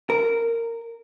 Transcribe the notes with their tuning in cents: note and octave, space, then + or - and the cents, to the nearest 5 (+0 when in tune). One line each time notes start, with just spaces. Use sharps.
A#4 -15